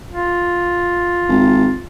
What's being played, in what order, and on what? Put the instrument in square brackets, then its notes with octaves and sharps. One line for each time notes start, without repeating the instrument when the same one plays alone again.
[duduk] F4
[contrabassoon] G#1